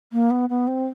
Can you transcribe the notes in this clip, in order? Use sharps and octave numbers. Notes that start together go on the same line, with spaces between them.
A#3
B3
B3
C4